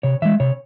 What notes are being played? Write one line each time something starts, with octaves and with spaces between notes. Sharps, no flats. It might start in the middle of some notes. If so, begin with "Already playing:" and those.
C3 C#5
E3 G#3 E5
C3 C#5